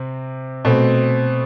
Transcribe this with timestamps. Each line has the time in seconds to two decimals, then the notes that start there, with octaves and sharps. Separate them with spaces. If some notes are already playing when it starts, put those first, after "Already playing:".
Already playing: C3 C4
0.65 B2 A3 C4